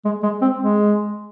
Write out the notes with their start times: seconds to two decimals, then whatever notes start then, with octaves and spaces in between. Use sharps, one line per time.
0.05 G#3
0.23 G#3
0.42 C4
0.60 G#3